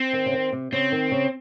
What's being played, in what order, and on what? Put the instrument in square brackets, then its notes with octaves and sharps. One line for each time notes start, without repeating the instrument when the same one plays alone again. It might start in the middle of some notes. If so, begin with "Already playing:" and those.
Already playing: [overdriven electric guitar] C4
[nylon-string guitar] D#3
C#3
D#3
C3
[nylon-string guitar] C#3 [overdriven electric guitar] C4
[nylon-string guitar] D#3
C#3